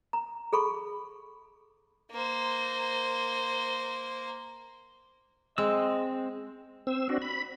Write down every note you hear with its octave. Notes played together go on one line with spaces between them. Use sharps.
A#5
G#4 A4 B5 C#6
A#3 C5
G#3 C4 D#5 E6
C4 E6
C4 D4 F#4
B5